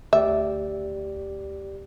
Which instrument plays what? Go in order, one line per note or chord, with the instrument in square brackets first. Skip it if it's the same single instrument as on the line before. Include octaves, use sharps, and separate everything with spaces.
[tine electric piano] D2 G4 D5 [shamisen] E5